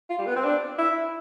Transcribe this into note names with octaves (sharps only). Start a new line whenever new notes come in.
F4
G3
B3
C4
D4
E4